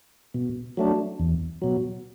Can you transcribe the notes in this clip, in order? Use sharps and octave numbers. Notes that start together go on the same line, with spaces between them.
B2
F#3 A3 D4
E2
B2 F#3